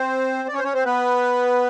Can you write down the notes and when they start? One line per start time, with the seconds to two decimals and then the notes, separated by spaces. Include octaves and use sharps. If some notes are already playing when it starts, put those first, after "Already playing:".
Already playing: C4 C5
0.48 D5
0.54 C#4 C#5
0.59 C5
0.64 C#4 C#5
0.74 C4 C5
0.86 B3 B4